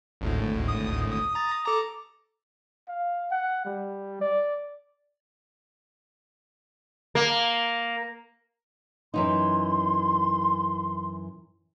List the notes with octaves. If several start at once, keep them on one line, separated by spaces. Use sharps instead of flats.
G#1 D2 A2
D#6
D#6
A#5 A6
A4 A#5 D6
F5
F#5
G3
D5
A#3
F#2 E3 D#4 C6